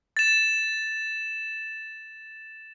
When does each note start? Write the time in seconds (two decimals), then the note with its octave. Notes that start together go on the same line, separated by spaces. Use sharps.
0.17 A6 E7